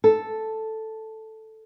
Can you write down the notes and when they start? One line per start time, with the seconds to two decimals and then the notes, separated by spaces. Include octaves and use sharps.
0.04 A4